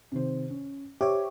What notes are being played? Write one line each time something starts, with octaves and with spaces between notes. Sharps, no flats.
C3 D#3 C5
C#4
G4 C5 C#5 E5 D6